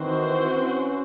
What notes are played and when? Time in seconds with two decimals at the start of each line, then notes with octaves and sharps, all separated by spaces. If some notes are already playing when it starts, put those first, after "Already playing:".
Already playing: D#3 E3 C4 F#4 C5
0.55 C#4